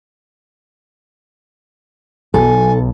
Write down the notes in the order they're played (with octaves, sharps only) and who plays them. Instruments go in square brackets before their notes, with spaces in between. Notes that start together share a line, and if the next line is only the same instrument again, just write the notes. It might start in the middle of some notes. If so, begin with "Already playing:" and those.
[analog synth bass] B1 [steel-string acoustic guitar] A4 [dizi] G#5